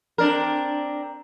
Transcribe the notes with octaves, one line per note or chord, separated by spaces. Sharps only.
C4 D4 A#4